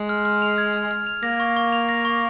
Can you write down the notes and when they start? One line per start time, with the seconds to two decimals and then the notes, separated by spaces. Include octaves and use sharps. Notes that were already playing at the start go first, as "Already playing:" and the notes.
Already playing: G#3
0.09 F6
0.25 F6
0.42 F7
0.58 G#6
0.74 F6
0.91 F6
1.07 F7
1.23 A#3 A#6
1.40 C#6
1.56 C#6
1.72 F7
1.89 A#6
2.05 C#6